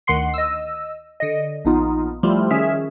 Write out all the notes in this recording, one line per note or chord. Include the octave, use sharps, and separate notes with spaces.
D2 D#3 F#5 C6 C7
D#5 E6
D3 D#5
A#1 B3 D#4 F4
F3 G3 A3 E4 F4 G4
D#3 C#4 G#4 E5 F6